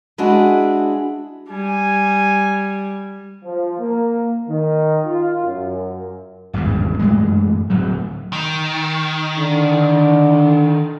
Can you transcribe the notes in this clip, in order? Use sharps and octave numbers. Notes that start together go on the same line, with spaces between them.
G#3 D4 E4 F#4 G#4
G3 G#5
F3
A#3
D#3
F4
F#2
G#1 E2 G2 C#3
F#2 A2 E3 G#3
D1 D#2 F#3
D#3
D3